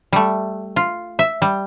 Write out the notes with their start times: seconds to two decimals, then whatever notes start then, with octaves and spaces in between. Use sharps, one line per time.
0.13 G3 A3
0.76 F4
1.19 E5
1.42 G3